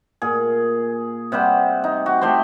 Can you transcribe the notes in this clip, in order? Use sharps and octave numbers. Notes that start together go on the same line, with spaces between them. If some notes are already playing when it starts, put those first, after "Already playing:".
A#2 G#4
C3 G3 C5 F#5
D#4
F#4
A3 G4 C5 C6